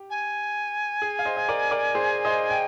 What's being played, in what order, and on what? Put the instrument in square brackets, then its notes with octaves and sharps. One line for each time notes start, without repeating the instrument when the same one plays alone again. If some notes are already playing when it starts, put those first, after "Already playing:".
Already playing: [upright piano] G4
[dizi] G#5
[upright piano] G#4
F5
C5 D#5
D#5
A#4 D5
A#4 D5
G#4 C5
C5 D#5
G5